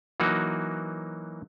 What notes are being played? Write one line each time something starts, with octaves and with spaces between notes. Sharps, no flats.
E3 F#3 A#3 D#4 F#4